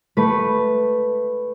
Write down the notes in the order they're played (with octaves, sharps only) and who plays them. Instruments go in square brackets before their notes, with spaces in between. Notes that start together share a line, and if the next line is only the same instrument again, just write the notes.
[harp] A3 B4